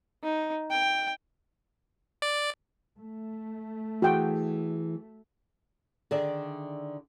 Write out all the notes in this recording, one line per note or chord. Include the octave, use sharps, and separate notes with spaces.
D#4
G5
D5
A3
E3 F#4 G#4 G5
D3 D#3 G#4 D5 E5 A5